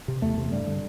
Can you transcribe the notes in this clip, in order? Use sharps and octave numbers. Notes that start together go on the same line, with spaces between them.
C3
E2 A3
C3
G2 G3
D3